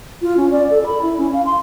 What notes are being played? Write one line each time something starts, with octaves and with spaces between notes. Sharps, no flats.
F4
C#4
D5
A4
B5
E4
C#4
F5
C6